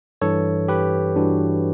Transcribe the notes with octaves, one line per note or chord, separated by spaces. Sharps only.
G2 E3 A4 C#5
G4 B4
G2 E3 D4 F#4